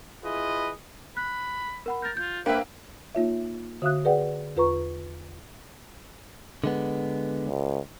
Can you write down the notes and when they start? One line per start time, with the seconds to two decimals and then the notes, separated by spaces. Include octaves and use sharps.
0.23 E4 F4 G#4 B4 D#5
1.17 B5 F#6
1.86 A#4 F#5 B5
2.02 A#4 G6 A6
2.17 F4 G6
2.46 A#3 D4 B4 C5 E5 G5
3.15 A#3 D#4 F4 C#5 E5
3.82 D3 F#4 E5 F5 D#6 F#6
4.05 G#4 B4 D5 F#5 G5
4.56 E2 F4 B4 A#5 C#6
6.64 D3 G#3 B3
7.47 C#2